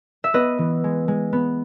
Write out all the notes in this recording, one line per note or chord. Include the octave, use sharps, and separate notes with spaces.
E5
B3 B4 D#5
E3
G#3
G#3
B3